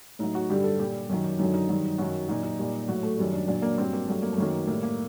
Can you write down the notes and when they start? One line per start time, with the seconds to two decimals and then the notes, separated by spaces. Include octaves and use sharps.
0.19 A2 F#3 D#4
0.35 F#4
0.50 G2 D3 G3 G4
0.64 A4
0.79 A#2 G3 G4
1.09 F#2 D#3 F#3
1.39 F#2 D3 F#3 D#4
1.54 D#4
1.69 G2 D#3 F#3
1.98 F#2 D#3 F#3 F#4
2.28 A#2 F#3 D#4
2.43 D#4
2.58 A#2 G3
2.88 A2 F#3 F#4
3.03 A3
3.18 F#2 D#3 G3
3.33 D4
3.48 A#2 F#3 D4
3.62 A#3
3.78 G2 F#3 C4
3.93 A#3
4.07 G2 F#3 A3
4.22 A#3
4.33 A3
4.38 F#2 D#3 F#3 A#3
4.67 A2 G3 A#3
4.83 A#3